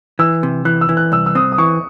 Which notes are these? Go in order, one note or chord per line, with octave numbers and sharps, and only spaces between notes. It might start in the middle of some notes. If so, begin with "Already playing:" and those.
E3 E6
C3
E3 F#6
E6
E3
F#6
C2 E6
E6
C4 D#6
D#6
E3 C#6